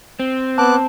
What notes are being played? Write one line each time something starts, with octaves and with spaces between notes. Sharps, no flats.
C4
B3 A5 D6 F#6